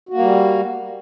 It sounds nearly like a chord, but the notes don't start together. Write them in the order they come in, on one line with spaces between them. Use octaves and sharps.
F#4 A#3 G3